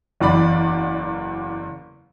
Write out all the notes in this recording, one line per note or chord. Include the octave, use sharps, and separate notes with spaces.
F#1 E2 D5 B5